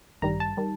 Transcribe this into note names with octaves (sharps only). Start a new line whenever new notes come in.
A1 G2 D#3 G3 A#5
A5
D#3 G3